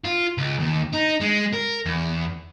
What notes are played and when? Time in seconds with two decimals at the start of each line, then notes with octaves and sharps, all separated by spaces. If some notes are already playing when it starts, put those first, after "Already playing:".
0.05 F4
0.38 C#2
0.60 D#2
0.93 D#4
1.20 G#3
1.53 A#4
1.85 E2